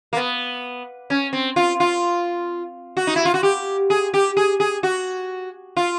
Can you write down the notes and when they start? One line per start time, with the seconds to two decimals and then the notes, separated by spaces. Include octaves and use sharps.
0.13 A#3
0.16 B3
1.10 C#4
1.33 C4
1.56 F4
1.80 F4
2.97 F#4
3.07 D#4
3.16 E4
3.25 F4
3.34 F#4
3.43 G4
3.90 G#4
4.14 G4
4.37 G#4
4.60 G#4
4.83 F#4
5.77 F4